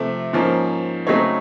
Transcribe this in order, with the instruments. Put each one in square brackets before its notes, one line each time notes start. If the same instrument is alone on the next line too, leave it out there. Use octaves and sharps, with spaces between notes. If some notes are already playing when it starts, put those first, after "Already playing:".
Already playing: [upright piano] C3 F3 A3 C4
G#2 F3 A#3 C#4
C#3 F#3 A3 C4 D#4 C#5